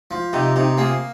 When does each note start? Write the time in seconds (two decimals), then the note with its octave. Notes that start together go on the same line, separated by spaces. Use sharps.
0.11 F3
0.33 C3 D#4 G4
0.56 C3 D#4 G4
0.77 A#3 F4 G#4